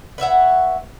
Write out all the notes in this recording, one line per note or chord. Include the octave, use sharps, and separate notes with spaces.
B4 C#5 E5 F#5